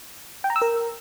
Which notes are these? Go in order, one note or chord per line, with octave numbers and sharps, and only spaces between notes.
G5
A#5
E6
A#4